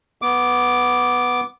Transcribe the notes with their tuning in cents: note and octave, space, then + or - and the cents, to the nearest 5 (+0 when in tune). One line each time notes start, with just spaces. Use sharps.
B3 +0 D6 +0